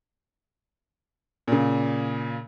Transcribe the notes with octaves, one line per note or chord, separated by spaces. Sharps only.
A#2 C#3